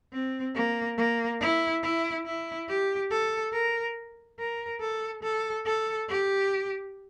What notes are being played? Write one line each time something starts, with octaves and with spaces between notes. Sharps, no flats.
C4
A#3
A#3
E4
E4
E4
G4
A4
A#4
A#4
A4
A4
A4
G4